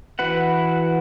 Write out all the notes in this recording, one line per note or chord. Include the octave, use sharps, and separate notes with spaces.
E3 F#4 B4 F#5